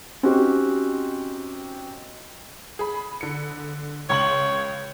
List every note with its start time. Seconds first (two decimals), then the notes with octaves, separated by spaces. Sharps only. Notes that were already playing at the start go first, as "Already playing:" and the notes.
0.23 C4 C#4 D#4 F#4 G4 G5
2.79 G#4 B5
3.21 D3 C#7
4.10 C#2 C#5 C6 F#7